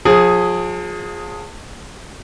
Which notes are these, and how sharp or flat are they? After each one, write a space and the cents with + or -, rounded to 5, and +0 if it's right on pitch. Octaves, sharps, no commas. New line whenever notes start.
F3 +40 G#4 +0